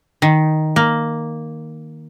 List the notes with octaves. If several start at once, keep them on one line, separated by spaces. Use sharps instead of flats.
D#3
A#3